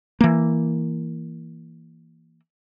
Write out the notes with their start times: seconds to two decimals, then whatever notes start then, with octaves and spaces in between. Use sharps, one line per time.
0.21 E3 A#3